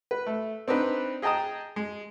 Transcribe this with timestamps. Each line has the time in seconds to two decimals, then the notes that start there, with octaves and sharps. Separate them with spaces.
0.11 B4
0.27 A3
0.68 C4 D4 D#4 B4
1.22 G#4 D#5 G5 A5 A#5 D#6
1.76 G#3